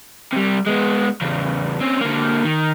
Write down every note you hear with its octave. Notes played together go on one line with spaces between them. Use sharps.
C3 G3
G#3 B3
E2 C#3
C4 C#4
D3 A#3
D#3